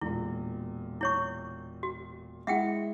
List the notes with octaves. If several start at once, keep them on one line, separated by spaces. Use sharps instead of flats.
E1 A#2 E4
E4 C#5 C#6
F#4
G#3 E4 E5 F#5 G5